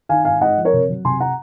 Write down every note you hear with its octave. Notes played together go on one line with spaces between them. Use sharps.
D#3 F5 G#5
G#2 F5 G#5
G#3 D#5 F#5
F3
A#4 C#5
C3
F#3
C3 G#5 C6
F#5 A#5